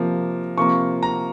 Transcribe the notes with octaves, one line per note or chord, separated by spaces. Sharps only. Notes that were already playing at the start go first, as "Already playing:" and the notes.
Already playing: C3 F3 A#3
C3 F3 A#3 C#6
A#5